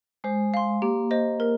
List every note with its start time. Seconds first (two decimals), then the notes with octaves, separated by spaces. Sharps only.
0.24 G#3 C5
0.54 F5 C6
0.82 A#3 G4
1.11 C5 D#5
1.40 A#4